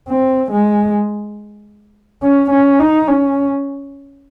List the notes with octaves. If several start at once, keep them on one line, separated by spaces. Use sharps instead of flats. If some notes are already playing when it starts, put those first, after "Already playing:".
C4
G#3
C#4
C#4
D#4
C#4